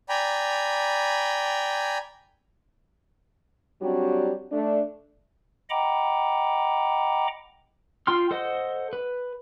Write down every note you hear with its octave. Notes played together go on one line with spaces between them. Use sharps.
D5 G5 G#5 A#5 B5
F#3 G3 C4 D4 F#4 G4
A3 D4
D#5 F#5 G5 A#5 B5 D6
F4 G5 C6 F6
A4 C5 D#5 F#5
B4